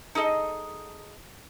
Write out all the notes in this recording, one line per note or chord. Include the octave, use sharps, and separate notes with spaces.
D#4 G#4 A4 D#5